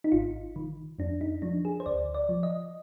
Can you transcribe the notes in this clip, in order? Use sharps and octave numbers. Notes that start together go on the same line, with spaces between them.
D#4
G#1 F4
D#3
F2 D4
D#4
F3 D4
G#4
C5
D2 D5
D5
F3
D#5